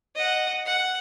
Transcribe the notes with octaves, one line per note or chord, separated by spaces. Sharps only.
D#5 F#5
F#5